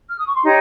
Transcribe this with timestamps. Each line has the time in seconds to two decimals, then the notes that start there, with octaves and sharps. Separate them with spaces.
0.09 F6
0.17 D#6
0.26 C#6
0.34 C6
0.43 D#4 G4 C#5 A#5